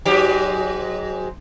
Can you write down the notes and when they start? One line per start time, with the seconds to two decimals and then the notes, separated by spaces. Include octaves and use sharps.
0.05 G#2 F#3 G4